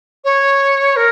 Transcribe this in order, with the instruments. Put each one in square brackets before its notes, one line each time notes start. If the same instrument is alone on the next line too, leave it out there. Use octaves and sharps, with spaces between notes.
[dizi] C#5
A#4